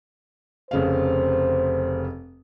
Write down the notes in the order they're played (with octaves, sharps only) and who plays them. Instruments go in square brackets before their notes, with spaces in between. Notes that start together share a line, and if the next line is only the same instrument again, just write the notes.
[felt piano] F1 C#3 F5 [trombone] C5